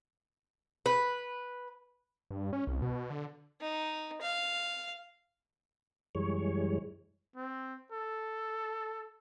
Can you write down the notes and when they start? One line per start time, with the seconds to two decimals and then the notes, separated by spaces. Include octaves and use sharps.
0.86 B4
2.31 G2
2.53 C#4
2.67 C2
2.82 B2
3.10 D3
3.61 D#4
4.22 F5
6.15 F#2 E3 G3 G#3 C#5
7.36 C4
7.92 A4